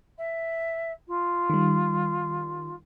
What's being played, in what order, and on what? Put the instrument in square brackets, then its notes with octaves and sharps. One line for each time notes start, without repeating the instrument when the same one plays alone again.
[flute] E5
F4
[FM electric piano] D#3 G3